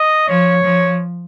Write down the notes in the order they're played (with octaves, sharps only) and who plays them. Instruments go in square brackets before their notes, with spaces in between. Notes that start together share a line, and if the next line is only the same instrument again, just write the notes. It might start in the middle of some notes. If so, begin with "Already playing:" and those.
Already playing: [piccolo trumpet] D#5
[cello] F3 [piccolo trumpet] C#5
[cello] F3